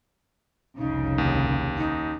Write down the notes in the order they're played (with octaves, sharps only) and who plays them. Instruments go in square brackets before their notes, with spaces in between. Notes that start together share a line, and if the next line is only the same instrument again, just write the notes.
[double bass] F1 C2 [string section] C#3 [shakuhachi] D#4
[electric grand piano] D#2
[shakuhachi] D#4